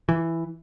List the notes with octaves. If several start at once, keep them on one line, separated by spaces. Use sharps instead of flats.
E3